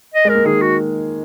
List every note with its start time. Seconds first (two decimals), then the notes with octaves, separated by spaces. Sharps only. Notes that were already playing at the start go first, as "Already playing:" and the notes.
0.14 D#5
0.25 G#3
0.29 A#4
0.35 A#3
0.45 D#3 G#4
0.62 F#4